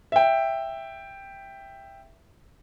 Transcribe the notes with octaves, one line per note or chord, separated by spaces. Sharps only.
E5 G5